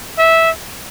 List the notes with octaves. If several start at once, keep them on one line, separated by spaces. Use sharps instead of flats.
E5